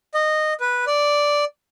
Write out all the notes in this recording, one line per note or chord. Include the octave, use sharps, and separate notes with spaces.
D#5
B4
D5